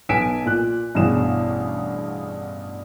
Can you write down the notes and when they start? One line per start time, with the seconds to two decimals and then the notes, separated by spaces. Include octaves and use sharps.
0.09 B1 B3 G#5 B6 D7 E7
0.45 A#2 F#6
0.95 A1 G2 B2 G#4 E7